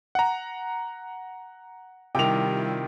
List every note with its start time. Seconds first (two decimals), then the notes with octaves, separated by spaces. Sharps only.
0.15 F#5 A#5
2.15 C3 D#3 G3 E4 F4 G5 F7